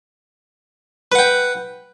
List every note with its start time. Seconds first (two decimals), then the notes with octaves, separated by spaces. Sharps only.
1.12 B4
1.15 F#5
1.19 G5